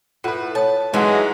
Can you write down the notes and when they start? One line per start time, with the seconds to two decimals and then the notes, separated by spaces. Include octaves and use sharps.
0.24 A2 F4 A4 B4 F#5
0.55 C#5 A5 D#6
0.94 G#2 E3 F#3 G#3 F#4 B4